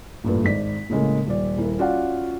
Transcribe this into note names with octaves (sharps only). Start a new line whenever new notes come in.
A1 G2 A#2 A3 B4
G#1 D5 B6
A2 C#3 G#3 A#3
D#1 D5
D#1 A#3 E4
C#4 F4 F#4 D5 F5 F#5